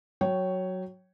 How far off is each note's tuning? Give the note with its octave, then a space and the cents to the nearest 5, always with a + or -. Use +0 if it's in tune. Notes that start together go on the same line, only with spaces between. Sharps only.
F#3 +5 C#5 +0 G5 -20